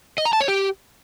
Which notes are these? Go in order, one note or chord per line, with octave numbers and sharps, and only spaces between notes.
D#5
A#5
A5
C#5
G4